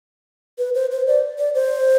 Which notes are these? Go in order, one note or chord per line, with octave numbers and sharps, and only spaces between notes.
B4
C5
C5
D5
D5
C5